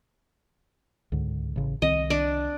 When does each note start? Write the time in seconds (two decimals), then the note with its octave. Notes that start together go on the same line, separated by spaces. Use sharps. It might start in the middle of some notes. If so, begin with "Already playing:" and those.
1.12 C#2 G#2 D3
1.56 A1 C#3
1.82 C2 D#3 C4 D#5
2.10 D4